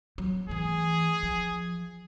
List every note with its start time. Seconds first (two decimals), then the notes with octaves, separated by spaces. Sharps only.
0.18 F#3
0.49 E3 A3 G#4
1.23 F3